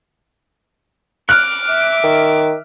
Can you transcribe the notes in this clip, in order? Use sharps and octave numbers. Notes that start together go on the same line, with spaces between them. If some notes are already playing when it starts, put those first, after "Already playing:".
D6 F6 F#6
E5
D#3